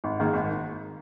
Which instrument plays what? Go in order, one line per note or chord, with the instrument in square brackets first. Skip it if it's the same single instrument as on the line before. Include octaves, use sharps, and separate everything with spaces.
[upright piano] G#1
G#2 D#3 A#3
G#1